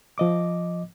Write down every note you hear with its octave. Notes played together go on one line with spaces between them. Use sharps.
F3 D#5 D6